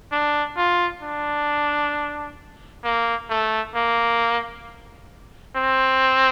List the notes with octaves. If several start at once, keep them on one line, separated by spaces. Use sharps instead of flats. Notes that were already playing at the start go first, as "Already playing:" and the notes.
D4
F4
D4
A#3
A3
A#3
C4